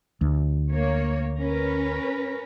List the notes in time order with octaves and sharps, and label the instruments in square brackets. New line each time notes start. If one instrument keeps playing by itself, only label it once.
[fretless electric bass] D2
[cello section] A#3 C#5
C#4 A#4 B4